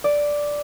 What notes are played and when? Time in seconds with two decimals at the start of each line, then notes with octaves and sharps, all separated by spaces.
0.04 D5